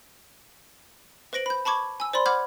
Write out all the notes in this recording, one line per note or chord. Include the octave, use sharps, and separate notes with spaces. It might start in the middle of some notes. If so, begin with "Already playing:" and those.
B4 C5 A#6 D7 F#7
B5 G6
A5 B5 C#6 D6 G#6
G#5 E6
C5 D5 B5 C6
F#5 B5 D6 F6 G6 G#6